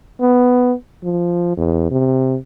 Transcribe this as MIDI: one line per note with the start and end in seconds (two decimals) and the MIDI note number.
0.20 0.73 59
1.04 1.54 53
1.57 1.89 40
1.91 2.37 48